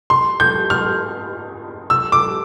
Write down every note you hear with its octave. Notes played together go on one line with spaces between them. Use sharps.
C6
G6
F6
E6
D6